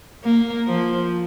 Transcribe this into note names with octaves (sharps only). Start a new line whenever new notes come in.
A#3
F3